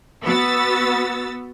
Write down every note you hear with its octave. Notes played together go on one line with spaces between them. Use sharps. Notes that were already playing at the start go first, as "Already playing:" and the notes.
B3 F#4 E6 A6